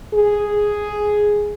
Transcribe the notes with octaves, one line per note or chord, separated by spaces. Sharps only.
G#4